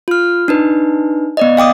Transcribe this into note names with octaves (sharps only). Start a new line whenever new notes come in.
F4 F6
D4 D#4 B4
B3 D5 D#5
F5 G5 D6 D#6